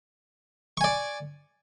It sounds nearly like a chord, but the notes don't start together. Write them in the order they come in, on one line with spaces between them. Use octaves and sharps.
C#6 G#5 D5